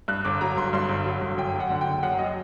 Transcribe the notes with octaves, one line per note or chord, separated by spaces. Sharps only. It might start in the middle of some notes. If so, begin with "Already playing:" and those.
G2 F#6
G1 D6
F#3 A#5
G1 C6
G2 C6
G1
F#3
G1
F#2 G5
F#3
F#5
D3 F#5
F#1 G5
F#2 F#5
F#5
F#3 D#5